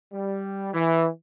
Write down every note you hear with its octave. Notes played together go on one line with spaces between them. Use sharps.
G3
E3